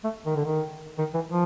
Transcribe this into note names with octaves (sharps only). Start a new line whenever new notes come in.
A3
D#3
D3
D#3
D#3
E3
F3